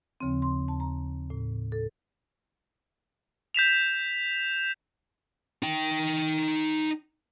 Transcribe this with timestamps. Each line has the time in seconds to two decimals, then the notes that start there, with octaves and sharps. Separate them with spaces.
0.20 D#2 C#3 F3 C4
0.42 C6
0.68 D#2 A5
0.80 A#5
1.30 A2
1.72 A4
3.55 G6 B6 E7 F7
5.63 D#4 G5